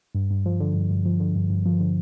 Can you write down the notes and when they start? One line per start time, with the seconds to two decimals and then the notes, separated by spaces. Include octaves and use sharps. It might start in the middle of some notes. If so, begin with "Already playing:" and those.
0.15 G2
0.30 G2
0.46 F3
0.60 D3
0.75 G2
0.90 G2
1.05 F3
1.20 D3
1.35 G2
1.50 G2
1.66 F3
1.80 D3